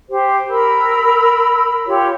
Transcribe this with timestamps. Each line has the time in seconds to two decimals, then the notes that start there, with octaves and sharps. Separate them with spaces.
0.10 G4 C5
0.49 A#4 B5 E6
1.87 F4 G4 C#5